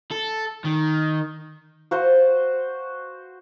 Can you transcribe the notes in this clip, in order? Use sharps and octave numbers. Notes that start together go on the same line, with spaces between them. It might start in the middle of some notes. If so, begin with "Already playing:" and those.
A4
D#3
F#4 C5 F#5